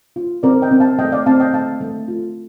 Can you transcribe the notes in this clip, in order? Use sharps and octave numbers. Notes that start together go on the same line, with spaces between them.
F4
C4 A#4 D5
D#5 G5
C4
F5 A5
A3 D#5 G5
D5 F5
C4 F5 A5
D#5 G5
A3 F5 A5
A3
F4